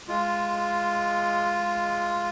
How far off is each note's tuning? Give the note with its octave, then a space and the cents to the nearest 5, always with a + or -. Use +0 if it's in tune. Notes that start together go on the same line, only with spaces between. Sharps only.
G#3 +0 F4 +0